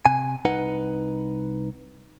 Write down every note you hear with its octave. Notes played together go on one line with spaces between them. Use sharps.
C3 G#5
C2 D#4 B4 F#5